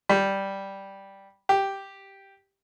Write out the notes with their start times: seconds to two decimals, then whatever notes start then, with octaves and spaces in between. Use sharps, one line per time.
0.09 G3
1.49 G4